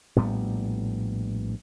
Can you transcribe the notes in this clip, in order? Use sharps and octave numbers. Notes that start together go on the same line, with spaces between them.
A#1 A2 G3 B3